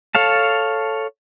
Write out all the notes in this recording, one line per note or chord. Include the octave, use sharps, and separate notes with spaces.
A4 C#5 F5 A5